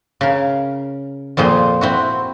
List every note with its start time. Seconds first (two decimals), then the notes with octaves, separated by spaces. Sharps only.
0.21 C#3 A#4
1.37 F2 A#2 C4 G#4 C6
1.81 C4 E4 F#4